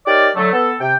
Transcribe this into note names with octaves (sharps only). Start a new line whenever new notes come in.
D#4 G4 A#4 C#5 D5
D3 F#3 A3
B3 A4
C3 G5